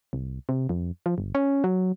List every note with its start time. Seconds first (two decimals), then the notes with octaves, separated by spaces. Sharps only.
0.13 C2
0.49 C3
0.69 F2
1.06 F3
1.18 G1
1.35 C#4
1.64 F#3